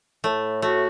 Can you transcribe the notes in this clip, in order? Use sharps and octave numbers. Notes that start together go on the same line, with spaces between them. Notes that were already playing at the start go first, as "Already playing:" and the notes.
A2 A3
A3 F#4